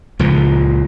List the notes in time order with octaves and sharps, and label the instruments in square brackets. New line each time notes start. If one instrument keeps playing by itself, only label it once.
[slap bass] C#2 A#2 F3